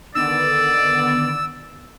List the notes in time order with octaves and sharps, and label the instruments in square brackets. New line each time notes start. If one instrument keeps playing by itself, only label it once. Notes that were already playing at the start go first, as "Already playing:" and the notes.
[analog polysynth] D3 D#3 B3 [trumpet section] D5 [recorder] E6